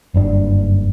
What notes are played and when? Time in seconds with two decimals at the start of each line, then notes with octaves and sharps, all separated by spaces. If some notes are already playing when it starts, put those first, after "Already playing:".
0.14 F#1 G2 D4